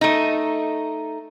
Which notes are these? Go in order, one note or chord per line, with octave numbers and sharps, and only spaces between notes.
A3 D#4